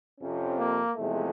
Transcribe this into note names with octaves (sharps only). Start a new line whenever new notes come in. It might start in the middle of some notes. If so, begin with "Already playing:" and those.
F2 C3 F3 C#4
A#3
E2 C3 F3 G#3 A3